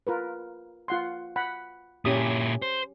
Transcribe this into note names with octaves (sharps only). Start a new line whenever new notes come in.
F4 A#4 B4
F4 F#5 C6
F#5 B5
A#2 C#4 E4 G4 D#6
C5